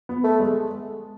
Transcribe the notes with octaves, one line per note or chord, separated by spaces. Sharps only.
B3
A3
G#3